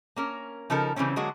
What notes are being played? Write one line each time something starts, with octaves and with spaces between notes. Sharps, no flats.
A#3 C#4 A#4
C#3 F3 D#4 A4 A#4
C#3 E3 G3 C4 C#4
D3 F#3 G#3 A#3 F#4